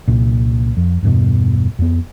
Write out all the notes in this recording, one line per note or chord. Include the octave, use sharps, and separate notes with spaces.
C2 A#2
F2
E2 G2 B2
F2 B3